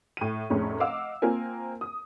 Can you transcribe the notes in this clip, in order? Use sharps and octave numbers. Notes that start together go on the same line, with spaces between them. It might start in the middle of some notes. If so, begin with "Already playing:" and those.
A2 D#7
F1 A2 C#4 G#4
D#5 F5 F#5 D6 E6
A#3 C4 F4 A#4 G#5
D#6